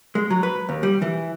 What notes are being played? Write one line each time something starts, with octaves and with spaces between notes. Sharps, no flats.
G#3
F#3
B4
D#2
G3
E3